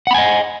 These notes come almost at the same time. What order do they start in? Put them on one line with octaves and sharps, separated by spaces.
F#5 B5 G#5 D#5